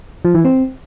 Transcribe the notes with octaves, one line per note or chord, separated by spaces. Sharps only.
F3
E3
C4